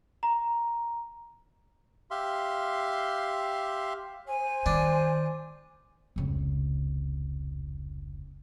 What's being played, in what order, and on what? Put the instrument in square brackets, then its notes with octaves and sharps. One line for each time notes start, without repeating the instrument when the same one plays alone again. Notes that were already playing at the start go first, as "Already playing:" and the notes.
[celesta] A#5
[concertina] G4 E5 F5 C6
[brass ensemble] C5 [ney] G#5
[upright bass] D#3 [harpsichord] D4
[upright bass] F1 C#2